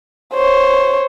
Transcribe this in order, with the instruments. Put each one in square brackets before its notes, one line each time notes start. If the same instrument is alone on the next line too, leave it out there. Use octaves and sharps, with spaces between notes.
[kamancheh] C5 C#5